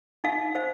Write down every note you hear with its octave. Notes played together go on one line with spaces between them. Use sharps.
D#4 F5
C5 F5